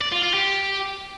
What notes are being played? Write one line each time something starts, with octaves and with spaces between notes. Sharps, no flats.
D5
F4
F4
G4